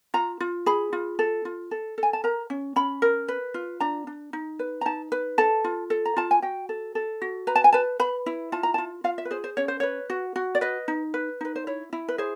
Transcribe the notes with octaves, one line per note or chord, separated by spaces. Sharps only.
F4 A#5
F4
G#4 B5
F4
A4
F4
A4
A4
G#5
A5
A#4 A#5
C#4
C#4 B5
A#4
B4
F4
D4 A#5
D4
D#4
B4
A#5
D#4 A5
B4
A4 A5
F4
A4
A#5
F4 A5
G#5
F#4 G5
A4
A4
F#4
B4 A#5
A5
G#5
B4 A5
B4 B5
E4
F4 A5
A#5
F4 A5
F4 F5
E5
B4
G#4 C5
C5
C#4 C#5
C5
B4 C#5
F#4
F#4
D5
B4 D#5
D#4
B4
D#4 B4
C5
E4 C#5
E4
B4
G#4 C5